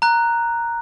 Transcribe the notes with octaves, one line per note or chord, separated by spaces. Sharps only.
A#5 F#6